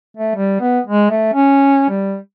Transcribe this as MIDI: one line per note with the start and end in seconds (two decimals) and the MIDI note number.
0.17 0.34 57
0.35 0.59 55
0.60 0.80 59
0.87 1.10 56
1.10 1.29 57
1.34 1.87 61
1.89 2.17 55